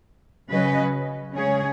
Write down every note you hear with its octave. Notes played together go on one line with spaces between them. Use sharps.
C#3 F#3 C#4 B4 D#5
C#3 G#3 C#4 G#4 C#5